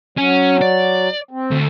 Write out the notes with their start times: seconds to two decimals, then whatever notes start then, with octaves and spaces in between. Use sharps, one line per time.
0.18 F#3 C#4
0.62 D5
1.31 C4
1.51 D2